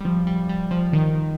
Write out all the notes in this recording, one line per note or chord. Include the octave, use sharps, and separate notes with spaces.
G3
F3
G3
G3
F3
D#3